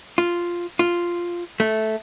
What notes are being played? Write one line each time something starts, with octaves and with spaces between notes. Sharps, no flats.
F4
F4
A3